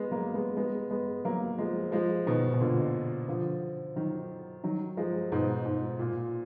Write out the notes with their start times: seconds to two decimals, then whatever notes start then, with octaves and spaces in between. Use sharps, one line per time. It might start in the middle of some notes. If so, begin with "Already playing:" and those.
Already playing: G#3 B3
0.11 F#3 A#3
0.34 G#3 B3
0.57 G#3 B3
0.91 G#3 B3
1.25 F#3 A#3
1.59 F3 G#3
1.92 F3 G#3
2.26 B2 D#3
2.54 B2
2.60 A#2 D3
3.28 D3 F3
3.96 D#3 F#3
4.64 D#3 F#3
4.97 F3 G#3
5.32 G#2 B2
5.65 G#2
5.99 A#2